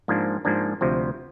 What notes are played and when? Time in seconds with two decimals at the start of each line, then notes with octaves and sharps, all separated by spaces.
0.08 G#2 F3 A#3 D4
0.45 G#2 F3 A#3 D4
0.81 D2 C3 F3